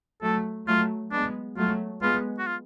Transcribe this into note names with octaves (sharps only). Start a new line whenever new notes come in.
F#3 A3 A4
F#3 A3 F4
G#3 B3 D4
F#3 A3 F4
G#3 B3 F4
F#4
F4